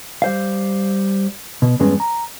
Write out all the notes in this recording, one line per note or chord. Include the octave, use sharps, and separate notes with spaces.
G3 C5 F5
B2
E2 G2 G#3 B3 C#4
A#5